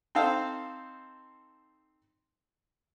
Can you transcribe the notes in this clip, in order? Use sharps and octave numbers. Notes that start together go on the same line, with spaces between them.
C4 D#4 A4 C5 F5